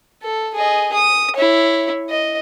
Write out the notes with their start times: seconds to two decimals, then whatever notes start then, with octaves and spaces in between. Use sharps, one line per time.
0.22 A4
0.54 G#4 D#5
0.94 D#6
1.36 E4 C#5
2.11 D#5